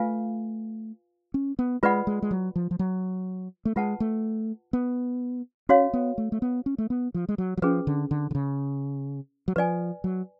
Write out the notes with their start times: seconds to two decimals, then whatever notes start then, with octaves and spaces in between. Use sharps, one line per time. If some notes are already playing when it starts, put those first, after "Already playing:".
Already playing: A3 F4 B4 F5 G#5
1.34 C#4
1.59 B3
1.83 G#3 F4 B4 D5 F#5 B5
2.07 G#3
2.22 G#3
2.31 F#3
2.56 F3
2.71 F3
2.79 F#3
3.65 A3
3.76 G#3 F4 B4 F#5 A5
4.00 A3
4.73 B3
5.69 C#4 F#4 C#5 F5
5.93 B3
6.18 A3
6.32 A3
6.42 B3
6.66 C#4
6.78 A3
6.90 B3
7.14 F3
7.29 G#3
7.38 F#3
7.57 F#3
7.62 F3 C#4 G#4 B4
7.87 D3
8.11 D3
8.31 D3
8.35 C#3
9.48 F#3
9.56 F3 B4 D5 G#5
10.04 F#3